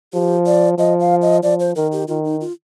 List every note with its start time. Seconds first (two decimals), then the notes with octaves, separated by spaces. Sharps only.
0.13 F3 G4
0.46 D5
0.78 F3 D#5
1.00 F5
1.22 D#5
1.43 F3 D5
1.60 C5
1.76 D#3 A#4
1.92 G4
2.08 D#3 F4
2.25 D#4
2.41 F4